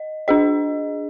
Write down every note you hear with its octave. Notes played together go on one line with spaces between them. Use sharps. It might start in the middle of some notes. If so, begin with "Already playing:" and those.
Already playing: D#5
D4 G#4 D#5